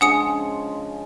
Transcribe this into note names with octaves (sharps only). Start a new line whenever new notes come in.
C#3 F3 G#3 D4 F#5 G#5 D#6 C#7